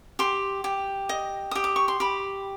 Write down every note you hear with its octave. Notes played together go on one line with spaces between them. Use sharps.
G4 C6
G4
D#5
G4 D#6
D6
C#6
C6
G4 B5